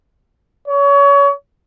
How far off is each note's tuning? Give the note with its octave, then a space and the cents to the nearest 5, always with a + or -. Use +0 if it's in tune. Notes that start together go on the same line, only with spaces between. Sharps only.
C#5 +30